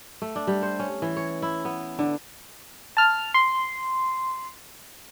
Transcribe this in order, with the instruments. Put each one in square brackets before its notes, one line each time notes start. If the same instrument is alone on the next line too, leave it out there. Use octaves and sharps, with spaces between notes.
[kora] A3
D4
G3
C5
C#4
E3
C#5
E4
B3
D3
[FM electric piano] A5 F6
C6